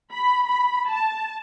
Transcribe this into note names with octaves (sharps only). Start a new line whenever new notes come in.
B5
B5
A5